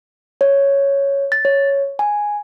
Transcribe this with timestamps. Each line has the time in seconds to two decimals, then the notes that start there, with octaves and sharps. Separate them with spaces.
0.41 C#5
1.32 A6
1.45 C#5
1.99 G#5